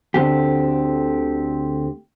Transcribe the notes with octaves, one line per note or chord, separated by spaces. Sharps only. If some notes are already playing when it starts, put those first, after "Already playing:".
D2 D3 C4 G4